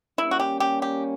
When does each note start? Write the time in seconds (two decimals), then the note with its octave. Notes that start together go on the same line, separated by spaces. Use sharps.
0.18 G3 A#3 C#4 E4
0.31 F#4
0.40 G4
0.60 G4
0.82 G4